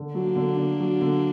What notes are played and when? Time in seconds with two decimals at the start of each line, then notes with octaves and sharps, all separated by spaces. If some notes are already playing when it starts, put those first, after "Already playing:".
Already playing: D3
0.14 F#3 A#3 D4
0.36 D3
0.57 D3
0.79 F#3
1.01 D3